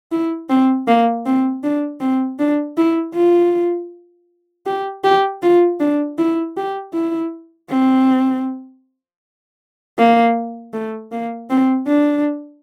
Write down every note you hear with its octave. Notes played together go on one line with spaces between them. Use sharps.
E4
C4
A#3
C4
D4
C4
D4
E4
F4
G4
G4
F4
D4
E4
G4
E4
C4
A#3
A3
A#3
C4
D4